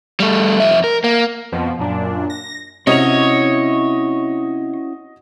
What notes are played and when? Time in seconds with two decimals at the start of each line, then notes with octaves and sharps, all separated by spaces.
0.20 G3 A3
0.60 F2 E5
0.84 A#4
1.04 A#3
1.52 F2 B2 F3
1.79 F#2 A#2 D4
2.30 A#6
2.87 C3 C#4 E4 F#4 C#5 D#5 F7